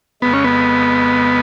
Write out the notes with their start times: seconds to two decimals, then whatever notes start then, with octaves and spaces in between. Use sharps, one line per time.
0.22 F2 C#3 G#3 B3
0.33 C#4
0.44 B3